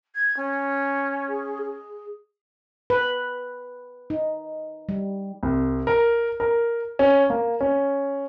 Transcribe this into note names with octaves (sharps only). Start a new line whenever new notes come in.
G#6
C#4
G#4
G#4
B4
D#4
G3
C2
A#4
A#4
C#4
A#3
C#4